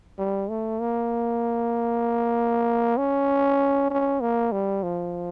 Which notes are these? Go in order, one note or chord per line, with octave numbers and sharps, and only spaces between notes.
G3
A3
A#3
C#4
C#4
A#3
G3
F3